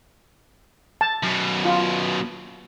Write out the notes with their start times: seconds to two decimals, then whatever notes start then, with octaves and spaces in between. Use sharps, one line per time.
1.01 A5
1.24 F#2 B2
1.65 F4